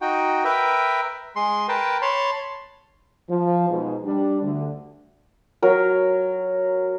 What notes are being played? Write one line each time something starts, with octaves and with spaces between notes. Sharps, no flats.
D#4 F#4 G5
A#4 B4 E5 G5
G#3 C6
A#4 B4 G5 A5
C#5 A5 B5 C6
F3
G#2 B2
G3 D4
D2 D3
F#3 A#4